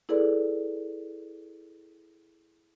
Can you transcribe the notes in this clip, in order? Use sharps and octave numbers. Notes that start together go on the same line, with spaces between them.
E4 G#4 A4 B4 D5